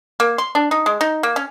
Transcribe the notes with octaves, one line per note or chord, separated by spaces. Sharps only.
A#3
C6
D4
D#4
G#3
D#4
A#3
C#4